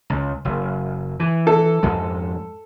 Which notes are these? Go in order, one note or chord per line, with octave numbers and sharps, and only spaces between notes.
C#2
F#1
E3
A4
F2 G#2 G#3